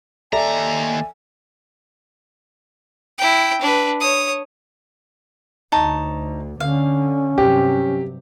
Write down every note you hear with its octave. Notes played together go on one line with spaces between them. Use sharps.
D#2 A4 D5 E5 G#5 A#5
E4 G5
D4 B4
C#5 D#6
D2 D#4 C#5 A5
D3 C#4 F5
G2 C3 F#3 G4